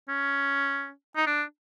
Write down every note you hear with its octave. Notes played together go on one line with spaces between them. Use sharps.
C#4
D#4
D4